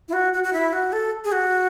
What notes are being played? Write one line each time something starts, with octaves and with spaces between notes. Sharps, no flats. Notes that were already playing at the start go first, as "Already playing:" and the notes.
E4
F#4
F#4
F#4
E4
F#4
A4
G#4
F#4